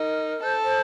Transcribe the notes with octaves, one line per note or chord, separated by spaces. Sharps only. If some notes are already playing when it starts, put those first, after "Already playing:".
Already playing: D#4 A#4
A4 C5
C5